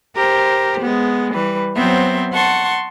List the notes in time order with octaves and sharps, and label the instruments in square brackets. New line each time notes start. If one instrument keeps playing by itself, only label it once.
[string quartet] G4 A#4 C5
G#3 B3
E3 G3 B4
F#3 B3 C4 C5 E5
F#5 A5 C6 C#6